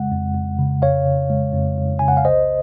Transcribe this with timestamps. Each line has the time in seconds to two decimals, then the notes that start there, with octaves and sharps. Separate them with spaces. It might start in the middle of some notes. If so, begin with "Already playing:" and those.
Already playing: F2 C#3 G#3 F#5
0.11 F2
0.35 F2
0.59 C#3
0.82 F2 C#5 F5
1.06 C#3
1.30 G#3
1.53 F2
1.77 F2
1.99 C#3 G#5
2.08 F#5
2.17 F5
2.25 C2 C5 D#5